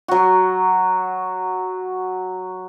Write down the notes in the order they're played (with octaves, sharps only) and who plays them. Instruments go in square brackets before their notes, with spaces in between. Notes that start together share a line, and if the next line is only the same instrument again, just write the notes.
[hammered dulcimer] F#3 F#4